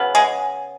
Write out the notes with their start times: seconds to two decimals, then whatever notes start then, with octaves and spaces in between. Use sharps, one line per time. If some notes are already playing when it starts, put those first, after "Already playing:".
Already playing: C#3 F#3 B3
0.15 G#3 G#4